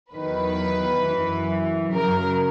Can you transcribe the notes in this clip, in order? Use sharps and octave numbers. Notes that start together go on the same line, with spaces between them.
E2 D#3 F#3 B4
F#2 E3
F#2 C#3 F#3 A#4